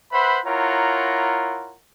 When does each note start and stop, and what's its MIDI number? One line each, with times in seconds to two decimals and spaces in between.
0.12 0.39 71
0.12 0.39 72
0.12 0.39 76
0.12 0.39 78
0.12 0.39 83
0.46 1.76 64
0.46 1.76 65
0.46 1.76 70
0.46 1.76 73
0.46 1.76 78
0.46 1.76 82